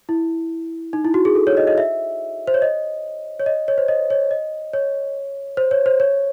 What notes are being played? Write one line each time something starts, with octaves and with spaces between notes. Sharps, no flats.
E4
D#4
E4
F#4
G#4
A4
C#5
D#5
D#5
E5
C5
C#5
D#5
C#5
D#5
C#5
C5
D#5
C#5
D#5
C#5
C5
C#5
C5
C#5